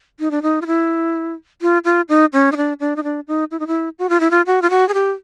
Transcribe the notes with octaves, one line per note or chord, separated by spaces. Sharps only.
D#4
D4
D#4
F4
E4
F4
F4
D#4
C#4
D#4
D4
D4
D#4
D4
D#4
E4
D#4
E4
F#4
F4
E4
F4
F#4
F4
F#4
G#4
G4